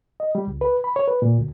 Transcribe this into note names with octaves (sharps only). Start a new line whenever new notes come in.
D#5
G3
C#2
B4
B5
C#5
B4
A#2
D2